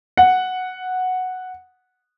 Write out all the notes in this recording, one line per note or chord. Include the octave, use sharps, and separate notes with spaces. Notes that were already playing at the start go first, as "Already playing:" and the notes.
F#5